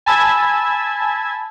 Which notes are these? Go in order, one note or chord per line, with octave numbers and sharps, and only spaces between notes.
G#5 A5 B5 E6 G#6